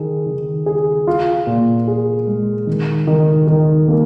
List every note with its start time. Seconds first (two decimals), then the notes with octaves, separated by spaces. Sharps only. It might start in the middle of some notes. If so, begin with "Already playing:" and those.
Already playing: D#3 G#4
0.26 D#3
0.66 G#4
1.07 F4
1.47 A#2
1.88 G#4
2.27 G#3
2.67 D#3
3.07 D#3
3.47 D#3
3.88 A#3